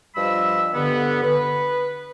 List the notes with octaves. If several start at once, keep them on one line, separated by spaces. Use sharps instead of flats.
G2 F3 G3 D#5 B5 E6
G2 D3 B3
B4